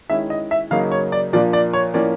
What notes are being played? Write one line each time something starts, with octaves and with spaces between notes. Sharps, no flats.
D#3 G#3 C#4 E4 E5
D#5
E5
C#3 F#3 A#3 D#4 F5
C#5
D5
A#2 F3 A#3 D4 D5
D5
C#5
A2 F3 A#3 C#4 D5